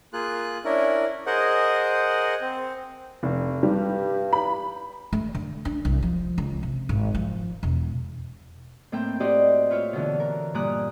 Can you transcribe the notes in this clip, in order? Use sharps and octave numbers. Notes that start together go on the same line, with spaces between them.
A#3 F4 G#4 F#6
C#4 D4 E4 A#4
G#4 A#4 C5 D#5 F#5
C4
F1
G2 G3
B5
A3
D3
D4
C2
F3
C#2
C3
G#1
F3
E1
A2 A#3 C4 E5 G5
E4 F#4 G4 C5 D5 D#5
F4 B4 C#5 E5 F6
B2 D3 E3
A#4
G2 A#2 A#5 D6 D#6 F#6